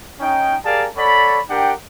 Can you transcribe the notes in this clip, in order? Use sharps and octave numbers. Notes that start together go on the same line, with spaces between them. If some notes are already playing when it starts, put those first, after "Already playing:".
C#4 D#4 G5
G4 G#4 A#4 D5 F5 A5
A4 C#5 D5 F#5 B5
D4 G4 A#4 F#5 G5